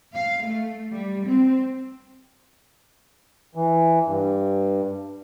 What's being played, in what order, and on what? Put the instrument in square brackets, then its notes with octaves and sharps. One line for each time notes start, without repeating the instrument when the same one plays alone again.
[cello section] F5
A3
G3
C4
[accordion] E3
G2